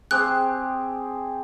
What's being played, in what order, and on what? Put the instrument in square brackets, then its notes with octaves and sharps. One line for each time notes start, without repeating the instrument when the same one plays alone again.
[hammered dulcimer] C4 G4 G#4 [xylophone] F#6